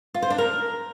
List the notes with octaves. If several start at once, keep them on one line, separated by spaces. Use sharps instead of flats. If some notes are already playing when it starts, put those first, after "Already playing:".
F4
C5
D4
A#4